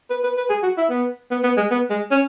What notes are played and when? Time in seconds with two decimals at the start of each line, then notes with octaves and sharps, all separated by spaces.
0.10 B4
0.23 B4
0.38 B4
0.50 G#4
0.63 F#4
0.78 E4
0.90 B3
1.31 B3
1.43 B3
1.57 G#3
1.71 B3
1.90 G#3
2.11 C#4